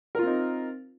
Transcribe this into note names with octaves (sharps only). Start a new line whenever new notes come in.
C4 D#4 F4 A#4